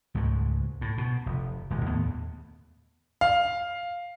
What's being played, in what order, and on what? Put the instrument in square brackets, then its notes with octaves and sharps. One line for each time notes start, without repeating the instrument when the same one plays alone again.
[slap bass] C#2 G#2 G#3 A3
A2
B2
F1
D#1 G#3
D#2 A2 B3
[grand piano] F5